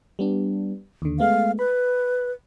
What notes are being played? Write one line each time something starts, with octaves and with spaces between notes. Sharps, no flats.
G3 B3 D4
D#2 D3
G#3 A3 B3 F5
B4 B5